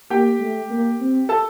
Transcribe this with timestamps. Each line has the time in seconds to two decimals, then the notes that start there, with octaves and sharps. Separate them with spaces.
0.10 A#3 G4 G5
0.40 A3
0.70 A#3
1.00 C4
1.29 A4 A5